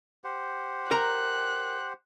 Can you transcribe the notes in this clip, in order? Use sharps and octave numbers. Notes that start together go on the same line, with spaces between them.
G4 C5 F#5
A#4 A#5 F#6